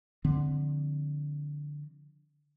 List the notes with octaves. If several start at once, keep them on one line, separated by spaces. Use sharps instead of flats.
D3 F3 C4